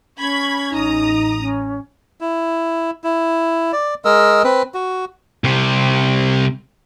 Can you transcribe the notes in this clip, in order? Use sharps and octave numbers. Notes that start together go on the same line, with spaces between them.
C#4 B5 C#6 G#6
A1 D#4 A#5 D#6
C#4
E4
E4
D5
G#3 A#4 D#5 E6
C4 B4
F#4
C2 C3